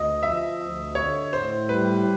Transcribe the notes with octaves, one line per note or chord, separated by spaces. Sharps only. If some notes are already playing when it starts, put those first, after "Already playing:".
Already playing: D2 D#5
F3 E5
D2
D3 C#5
A2 C5
G3 B4